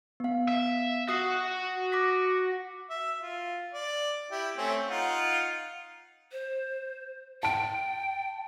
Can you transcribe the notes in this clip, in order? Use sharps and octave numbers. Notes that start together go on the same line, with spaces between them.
B3 F5
E5
F#4 D#6 C7
D6 A#6 B6
E5
F4
D5
E4 G4
A3 C4 C#4
D#4 F4 F#5
C5
G5 A5 D7